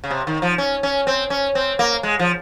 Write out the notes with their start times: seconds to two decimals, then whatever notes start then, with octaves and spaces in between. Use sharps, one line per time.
0.04 C#3
0.10 C3
0.27 D#3
0.42 F3
0.58 C#4
0.83 C#4
1.07 C4
1.30 C#4
1.55 C4
1.79 A#3
2.03 G#3
2.19 F3